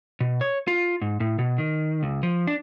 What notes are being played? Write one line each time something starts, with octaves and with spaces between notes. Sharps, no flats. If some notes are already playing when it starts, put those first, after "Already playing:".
B2
C#5
F4
G#2
A2
B2
D#3
C#2
F3
D4